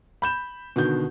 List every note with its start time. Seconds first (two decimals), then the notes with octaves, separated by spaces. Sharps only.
0.22 B5 G6 E7
0.76 B2 D3 D#3 G6